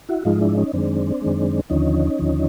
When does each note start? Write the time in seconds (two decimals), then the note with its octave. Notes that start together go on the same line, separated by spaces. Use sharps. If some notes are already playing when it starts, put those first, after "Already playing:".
0.09 E4 F#4
0.25 G#2 F3 G#3 D#4 F4
0.41 D4 E4
0.57 C#4 D#4
0.73 F#2 D#3 G#3 C4 D4
1.21 F#2 D#3 G#3
1.70 D#2 D3 F3 C#4 D#4
2.19 D#2 D3 F3